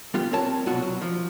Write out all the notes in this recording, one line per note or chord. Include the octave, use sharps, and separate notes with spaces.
G3 B3 F4 G4
C4 A#4 C#5 A5
C2 B2 F#3 F4 F#4
F#3
F3